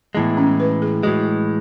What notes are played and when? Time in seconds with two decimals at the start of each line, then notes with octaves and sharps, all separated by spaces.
0.15 A2 E3 G#3 B3
0.37 C#4
0.60 B4
0.82 G#4
1.03 A2 E3 G#3 F#4